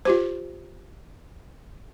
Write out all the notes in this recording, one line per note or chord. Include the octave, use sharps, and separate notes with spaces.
F4 G4 C5